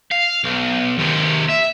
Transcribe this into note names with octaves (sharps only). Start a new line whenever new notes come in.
F5
B1
D#2 C3
E5